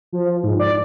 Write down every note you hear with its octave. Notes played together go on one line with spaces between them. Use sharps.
F3
G#2
D5